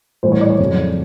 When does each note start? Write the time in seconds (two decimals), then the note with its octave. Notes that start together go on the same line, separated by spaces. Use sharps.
0.23 A2 E3 G3 C5
0.32 C#5
0.41 D5
0.50 C#5
0.59 F2 C#3 F#3